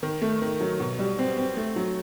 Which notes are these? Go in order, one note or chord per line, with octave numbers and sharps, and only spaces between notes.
D#3
A3
D#3
F#3
B2
G3
C4
C4
A3
F#3